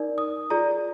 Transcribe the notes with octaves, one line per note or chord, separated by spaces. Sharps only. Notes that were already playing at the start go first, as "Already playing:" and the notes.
Already playing: D#4 A#4 D5
D#6
F4 G#4 D5 A#5